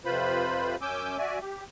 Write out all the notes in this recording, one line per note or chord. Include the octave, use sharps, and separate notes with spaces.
F2 C3 F4 B4 C5 B5
F#2 C#4 G#5 D6 E6 G6
F#4 D5 E5 G#5
G4